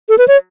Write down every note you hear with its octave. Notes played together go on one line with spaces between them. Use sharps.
A4
B4
C#5